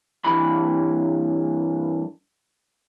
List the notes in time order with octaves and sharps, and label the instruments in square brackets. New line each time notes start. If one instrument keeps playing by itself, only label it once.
[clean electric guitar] G2 E3 B5